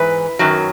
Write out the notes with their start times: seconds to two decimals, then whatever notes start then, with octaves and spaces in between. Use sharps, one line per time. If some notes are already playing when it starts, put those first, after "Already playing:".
Already playing: G#2 E3 B4
0.39 F#2 D#3 F#3